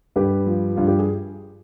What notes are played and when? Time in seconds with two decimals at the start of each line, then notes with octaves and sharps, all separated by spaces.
0.16 G2 G4 B4
0.47 F3
0.76 G2 F4
0.88 G4
0.98 G#4